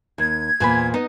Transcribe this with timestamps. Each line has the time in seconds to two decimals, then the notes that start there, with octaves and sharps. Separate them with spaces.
0.18 D#2 G#6
0.60 E2 A#2 C5 G#5 B5
0.94 B3 D#4 D#5